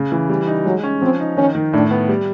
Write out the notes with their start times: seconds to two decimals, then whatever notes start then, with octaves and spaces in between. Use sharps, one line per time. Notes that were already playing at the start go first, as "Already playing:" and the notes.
Already playing: C#3
0.12 E3
0.30 G3
0.47 D#4
0.65 F#3 G#3
0.83 C#4
1.01 F3 C4
1.20 D#4
1.37 D#3 C#4
1.55 D#3
1.73 A2 D4
1.91 B3
2.09 G3